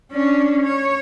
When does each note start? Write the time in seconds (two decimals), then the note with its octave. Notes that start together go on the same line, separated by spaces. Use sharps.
0.12 C#4 D4
0.63 C#5